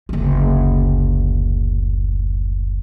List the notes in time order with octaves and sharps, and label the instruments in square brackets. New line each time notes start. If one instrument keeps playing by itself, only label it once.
[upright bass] F#1 D2